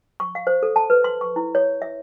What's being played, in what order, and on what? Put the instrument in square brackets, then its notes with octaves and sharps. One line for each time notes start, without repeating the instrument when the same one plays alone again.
[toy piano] C#6
F5
C5
A4
A5
B4
C6
C#6
E4
C#5
E5